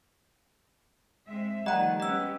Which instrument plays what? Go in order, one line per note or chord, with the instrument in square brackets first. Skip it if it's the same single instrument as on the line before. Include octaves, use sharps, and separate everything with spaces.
[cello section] G#3 C4 E5
[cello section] D#3 F3 A3 [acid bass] G3 [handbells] D#5 A#5 [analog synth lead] F#5
[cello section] B3 C#4 G4 [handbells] D#5 E6